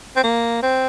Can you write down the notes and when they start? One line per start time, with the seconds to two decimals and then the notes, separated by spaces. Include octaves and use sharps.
0.16 C4
0.24 A#3
0.63 C4